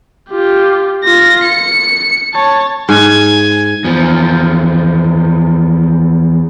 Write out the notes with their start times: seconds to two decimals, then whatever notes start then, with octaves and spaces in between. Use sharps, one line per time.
0.30 F4 G4
1.04 F4 A#6
1.44 C#7
2.34 C#5 A5
2.89 G#2 G#5
3.84 E2 F3